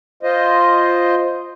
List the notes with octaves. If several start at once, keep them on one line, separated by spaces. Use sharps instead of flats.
F4 C5 D#5